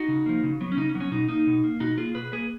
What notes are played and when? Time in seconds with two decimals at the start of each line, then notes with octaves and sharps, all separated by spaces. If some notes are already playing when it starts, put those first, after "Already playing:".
Already playing: D#4 F#4
0.08 C#3
0.26 F3 A#3
0.43 C#3
0.61 F#3 B3
0.72 C#4
0.77 C#3 D#4
0.89 C#4
0.95 F#3 B3
1.00 C#4
1.11 B2 D#4
1.29 A#3 D#4
1.47 B2
1.64 A#3
1.80 B2 D#4 F#4
1.98 A#3 F4 G#4
2.15 B2 G#4 B4
2.32 A#3 G#4 B4